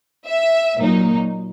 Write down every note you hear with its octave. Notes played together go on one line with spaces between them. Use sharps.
E5
A#2 F#3 A#3 D#4